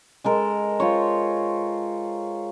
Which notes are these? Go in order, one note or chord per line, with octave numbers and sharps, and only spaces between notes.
G#3 A4 A#4
F4 C5 C#5